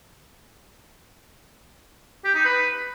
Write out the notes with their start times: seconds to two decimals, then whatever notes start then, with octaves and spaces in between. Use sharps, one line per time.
2.25 G4
2.35 D#4
2.45 B4